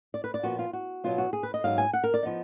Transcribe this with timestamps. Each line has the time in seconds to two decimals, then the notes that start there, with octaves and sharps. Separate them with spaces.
0.14 D5
0.24 B4
0.34 D5
0.43 A#2 F3 B3 F#4
0.59 F4
0.73 F#4
1.04 B2 F#3 B3 F4
1.18 F#4
1.33 G#4
1.43 B4
1.54 D#5
1.64 G#2 F#3 B3 D#4 F5
1.78 G#5
1.93 F#5
2.04 A#4
2.14 D5
2.23 F3 B3 D#4